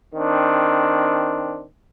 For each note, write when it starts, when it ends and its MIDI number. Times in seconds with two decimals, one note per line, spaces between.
0.13 1.63 51
0.13 1.63 60
0.13 1.63 62